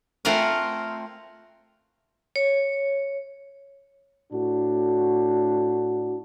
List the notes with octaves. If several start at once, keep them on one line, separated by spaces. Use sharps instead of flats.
A3 C4 F4 A#4 F#5 G#5
C#5
A2 D4 F#4